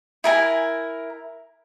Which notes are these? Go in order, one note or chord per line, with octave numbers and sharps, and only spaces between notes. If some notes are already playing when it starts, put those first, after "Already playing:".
E4 A#4 G#5